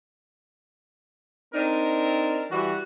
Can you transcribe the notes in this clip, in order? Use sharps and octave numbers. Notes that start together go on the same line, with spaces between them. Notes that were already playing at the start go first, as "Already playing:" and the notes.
C4 D4 D#4 A#4
E3 G3 F#4